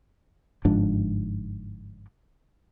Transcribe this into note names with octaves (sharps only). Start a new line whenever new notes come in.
G1 G#2 F3 D4